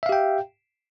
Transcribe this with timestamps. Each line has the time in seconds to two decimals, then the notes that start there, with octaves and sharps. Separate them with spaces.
0.03 E5
0.06 F5
0.09 G4
0.12 G5